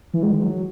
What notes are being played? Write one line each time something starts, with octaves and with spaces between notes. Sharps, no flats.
E3
G#3
D#3
F#3